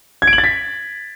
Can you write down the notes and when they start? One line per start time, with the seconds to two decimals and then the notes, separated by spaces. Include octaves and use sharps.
0.22 G#6
0.27 D7
0.33 F#7
0.38 A6
0.44 B6